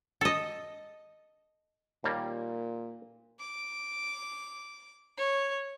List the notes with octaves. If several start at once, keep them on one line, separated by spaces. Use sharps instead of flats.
A4 D#5
D#2 A#2 G3 A#3
D6
C#5